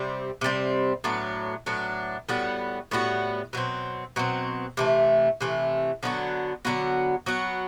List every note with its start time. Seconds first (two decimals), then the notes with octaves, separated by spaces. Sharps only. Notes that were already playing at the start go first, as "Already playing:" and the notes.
Already playing: C3 G3 C4
0.41 C3 G3 C4
1.04 A2 F#3 B3 D4
1.66 A2 F#3 B3 D4
2.29 A2 G3 B3 F#4
2.91 A2 G3 B3 F#4
3.53 B2 F#3 C4
4.16 B2 F#3 C4
4.77 C3 E3 A3
5.41 C3 E3 A3
6.03 D3 F#3 B3 F#4
6.65 D3 F#3 B3 F#4
7.26 F#3 B3 F#4